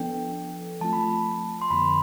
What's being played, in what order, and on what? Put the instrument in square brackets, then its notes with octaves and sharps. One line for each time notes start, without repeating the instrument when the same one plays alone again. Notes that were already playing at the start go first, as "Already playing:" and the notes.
Already playing: [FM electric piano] F3 B3 D4 A4 [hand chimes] G5
[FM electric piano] F3 A3 C4 F4 [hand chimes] A5
[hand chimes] B5
A5
C6
[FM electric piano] F2 D3 F3 B3 [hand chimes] B5